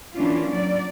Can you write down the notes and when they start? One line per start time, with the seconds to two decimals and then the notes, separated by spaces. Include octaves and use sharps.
0.15 E3 A#3 C#4 D4 F4
0.51 F#3 D5